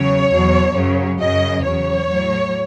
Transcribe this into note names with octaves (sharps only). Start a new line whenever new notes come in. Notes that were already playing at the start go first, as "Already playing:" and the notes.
Already playing: E2 C#3 F#3 C#5
E2 B2 F#3
F#2 C#3 F#3
F#2 C#3 F#3 D#5
E2 C#3 F#3 C#5
A2 F#3